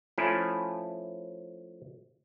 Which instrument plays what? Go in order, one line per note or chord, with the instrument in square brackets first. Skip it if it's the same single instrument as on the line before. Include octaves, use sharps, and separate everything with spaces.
[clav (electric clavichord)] F3 A3 C#4 E4